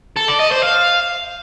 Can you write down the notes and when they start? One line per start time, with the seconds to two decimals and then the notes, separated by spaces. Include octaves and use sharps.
0.16 A4
0.28 D5
0.40 D#5
0.51 C5
0.63 F5